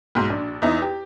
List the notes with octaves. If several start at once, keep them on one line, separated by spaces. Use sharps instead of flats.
B1 G#2
A#1 D4
E2 D#4 E4
G4